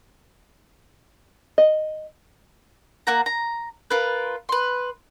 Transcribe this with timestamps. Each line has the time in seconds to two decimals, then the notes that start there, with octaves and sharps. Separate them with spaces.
1.58 D#5
3.07 A#3 F#5 A#5
3.26 A#5
3.90 F4 A#4 B4
4.49 B4 C6